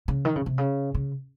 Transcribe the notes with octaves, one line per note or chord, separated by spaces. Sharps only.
C#3
D#3
C#3
C3
C#3
C#3